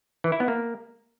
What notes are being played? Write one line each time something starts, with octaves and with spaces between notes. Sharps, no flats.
E3
E4
B3
A#3